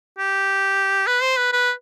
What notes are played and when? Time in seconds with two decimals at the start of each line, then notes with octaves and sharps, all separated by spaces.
0.18 G4
1.07 B4
1.22 C5
1.37 B4
1.53 B4